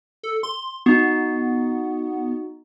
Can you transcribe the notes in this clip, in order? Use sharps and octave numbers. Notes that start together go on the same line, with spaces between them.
A4
C6
B3 D#4 F#4